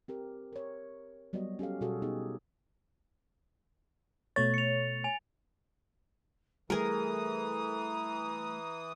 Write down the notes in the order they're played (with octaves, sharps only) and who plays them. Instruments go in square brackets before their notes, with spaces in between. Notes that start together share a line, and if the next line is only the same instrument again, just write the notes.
[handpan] C4 G4 A#4
A#4 C#5
F#3 G3 B3 F#4 C#5 D#5
C#4 G4 A4 F5
B2 G3 F#4 G#4 A4 F5
B3 D#4 G4 G#4
[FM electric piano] B2 A3 C#5 [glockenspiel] A6
[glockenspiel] C#7 F7
G#5 F7
[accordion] E3 D#6 [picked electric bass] G3 A3 [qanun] G#4 A#4 [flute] A#5